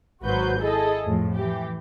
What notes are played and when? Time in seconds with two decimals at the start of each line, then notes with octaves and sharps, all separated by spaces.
0.24 G#1 F#3 F#4 B4 C5 G6
0.60 E4 G#4 A4 D#5
1.05 F2 A2 F3
1.35 E3 G4